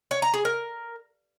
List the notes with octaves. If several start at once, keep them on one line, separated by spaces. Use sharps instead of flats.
C#5
A#5
G#4
A#4